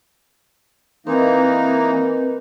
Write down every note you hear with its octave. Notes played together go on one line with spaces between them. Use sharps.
E3 A#3 C4 D#4 A#4 B4